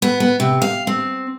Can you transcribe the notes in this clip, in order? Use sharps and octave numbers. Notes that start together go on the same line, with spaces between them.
B3
B3
C3
F5
C4